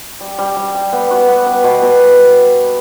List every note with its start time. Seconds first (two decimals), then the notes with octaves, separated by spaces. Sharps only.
0.21 G3
0.39 G3
0.56 G3
0.75 G3
0.93 B3
1.11 F#4
1.29 B3
1.46 B4
1.64 B2
1.82 B2